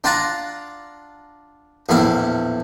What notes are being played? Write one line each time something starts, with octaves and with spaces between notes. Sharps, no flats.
D4 F4 F#5 A5 A#5
A#1 E2 A2 E4 F5